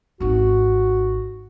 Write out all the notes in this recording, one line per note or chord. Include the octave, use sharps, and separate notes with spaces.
G#1 D#4 F#4